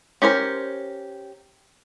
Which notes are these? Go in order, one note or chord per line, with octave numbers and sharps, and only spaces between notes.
C#4 G4 A#4 C5